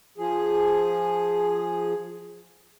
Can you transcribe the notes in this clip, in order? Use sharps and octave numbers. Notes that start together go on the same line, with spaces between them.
F3 G#4